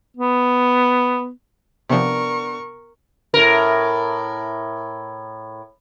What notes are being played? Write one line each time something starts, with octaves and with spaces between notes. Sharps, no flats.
B3
C3 F3 B3 D4 A#4 F#5 C#6
A2 A#4